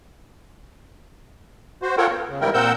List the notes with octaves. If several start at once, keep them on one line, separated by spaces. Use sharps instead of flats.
F#4 C5
F4 A4 A#4 C#5 F#5 G5
B3
C#3
G#2 E3 G3 E4 A#4 G5
A#2 C4 A#4 F#5 E6 G6